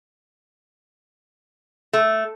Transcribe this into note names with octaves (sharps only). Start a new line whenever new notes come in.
A3